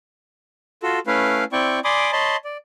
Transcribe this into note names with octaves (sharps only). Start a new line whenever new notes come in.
F4 F#4 A4
A3 C#4 E4 B4 F5
C4 E4 D5 G5 C#6
D5 G#5 B5 C6 D6 D#6
C#5 D#5 A5 B5 C6
D5